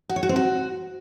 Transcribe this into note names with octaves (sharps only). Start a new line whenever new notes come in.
F#4
C#5
F#4
C4
F#4